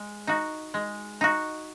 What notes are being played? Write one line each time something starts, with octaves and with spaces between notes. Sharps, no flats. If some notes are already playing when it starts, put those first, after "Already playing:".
Already playing: G#3
D#4 F#4
G#3
D#4 F#4